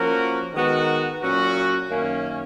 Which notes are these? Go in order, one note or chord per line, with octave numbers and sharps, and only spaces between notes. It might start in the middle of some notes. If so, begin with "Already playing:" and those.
Already playing: F3 A#3 C#4 F#4 A#4
D#3 G#3 B3 F#4 A#4
A#2 F#3 C#4 F#4
F#2 D#3 A#3 C#4